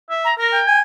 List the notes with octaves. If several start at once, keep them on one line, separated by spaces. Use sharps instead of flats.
E5
A#5
A#4 A#6
G5
G#5